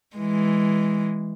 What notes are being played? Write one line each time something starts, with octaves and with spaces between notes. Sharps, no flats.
E3 G#3